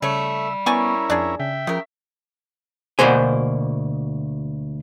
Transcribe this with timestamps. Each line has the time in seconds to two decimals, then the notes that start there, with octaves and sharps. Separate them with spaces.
0.02 C#3 G3 A3 C#5 E5
0.66 B3 C#4 E4 A#4 D5 G#5 C#6
1.10 F2 D4 G#4
1.40 C#3 E5 G5
1.67 C#3 F3 A#4
2.99 D2 B2 A#3 C5 G#5